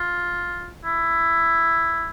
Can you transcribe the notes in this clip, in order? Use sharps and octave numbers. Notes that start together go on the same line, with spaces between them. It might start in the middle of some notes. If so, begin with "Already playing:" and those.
Already playing: F4
E4